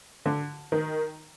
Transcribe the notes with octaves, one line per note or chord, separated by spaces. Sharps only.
D3
D#3